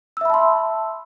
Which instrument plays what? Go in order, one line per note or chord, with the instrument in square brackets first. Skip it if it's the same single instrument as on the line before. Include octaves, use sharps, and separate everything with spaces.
[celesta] E6
E5
B5
A5
C6